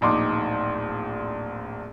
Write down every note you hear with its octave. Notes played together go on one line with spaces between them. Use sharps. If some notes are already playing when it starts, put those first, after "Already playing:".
D1 A#1 D#4 C6 D6